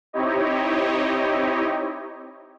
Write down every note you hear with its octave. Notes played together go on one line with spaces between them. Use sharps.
C4 D#4 E4 G4 C#5 D#5